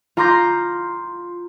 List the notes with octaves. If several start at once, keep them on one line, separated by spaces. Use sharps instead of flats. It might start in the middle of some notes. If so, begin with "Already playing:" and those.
F4 A#5 C6 D6 G6 A#6